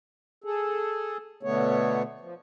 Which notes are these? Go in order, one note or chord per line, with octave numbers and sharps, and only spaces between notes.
G#4 A4
B2 D3 A3 B3 C#5
F3